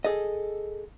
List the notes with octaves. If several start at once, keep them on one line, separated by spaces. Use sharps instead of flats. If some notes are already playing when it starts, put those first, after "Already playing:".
G#4 A4 D#5